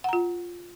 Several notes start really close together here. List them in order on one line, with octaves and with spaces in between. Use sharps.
F#5 A#5 F4